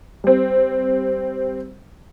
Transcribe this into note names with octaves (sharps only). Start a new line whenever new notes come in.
G3 C4